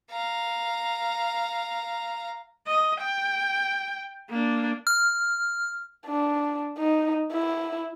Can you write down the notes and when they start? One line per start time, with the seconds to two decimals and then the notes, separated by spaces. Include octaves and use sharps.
0.11 F5 A#5
2.67 D#5
3.01 G5
4.29 A#3 D4
4.87 F6
6.06 D4
6.78 D#4
7.32 E4